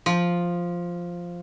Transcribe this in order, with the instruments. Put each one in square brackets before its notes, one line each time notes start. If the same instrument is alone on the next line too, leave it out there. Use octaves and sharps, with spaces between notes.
[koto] F3